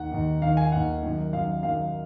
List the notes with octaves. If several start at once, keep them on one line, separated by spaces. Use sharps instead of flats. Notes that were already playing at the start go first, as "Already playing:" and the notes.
Already playing: D#2 D#3 F#5
D#2 D#3
D#2 D#3 F5
G#5
D#2 D#3 F#5
F#2 D#3
F#2 D#3 F5
F#2 D#3 F5